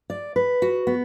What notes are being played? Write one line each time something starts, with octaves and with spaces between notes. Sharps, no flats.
D5
B4
F#4
B3